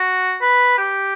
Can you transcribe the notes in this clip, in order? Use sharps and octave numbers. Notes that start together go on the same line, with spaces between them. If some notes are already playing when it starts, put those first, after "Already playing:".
Already playing: F#4
B4
G4